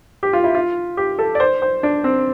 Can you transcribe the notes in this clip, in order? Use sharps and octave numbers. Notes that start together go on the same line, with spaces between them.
G4
F4
E4
F4
G4
A4
D5
C5
C5
D4
C4